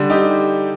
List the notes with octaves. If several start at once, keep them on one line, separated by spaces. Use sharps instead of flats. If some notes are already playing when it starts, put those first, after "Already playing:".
Already playing: D3 G3
D#4 G4